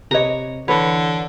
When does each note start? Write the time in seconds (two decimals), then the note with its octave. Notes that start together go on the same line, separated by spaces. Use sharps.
0.11 C3 G4 B4 C#5 D#5 A#5
0.68 D3 E3 B4 C#5